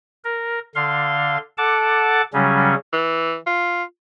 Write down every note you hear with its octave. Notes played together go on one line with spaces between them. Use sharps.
A#4
D3 F5 C6
A4 F#5 A5 D6
C#3 F#3 G3 C#4
E3
F4